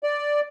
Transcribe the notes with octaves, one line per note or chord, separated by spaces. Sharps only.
D5